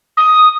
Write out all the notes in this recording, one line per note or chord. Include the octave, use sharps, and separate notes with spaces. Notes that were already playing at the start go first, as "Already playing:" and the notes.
D#6